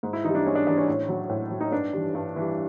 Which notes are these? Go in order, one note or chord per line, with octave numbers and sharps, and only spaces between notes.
G#2
E4
E3 G3 D#4
D4
G#2 C#4
D4
E3 G3 D4
C#4
A2 C#4
F#3
A2
F#3
D#4
G2 D4
E3 G3
G2
E3 G3